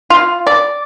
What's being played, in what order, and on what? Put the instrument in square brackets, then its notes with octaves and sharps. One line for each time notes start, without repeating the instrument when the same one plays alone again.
[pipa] F4
D5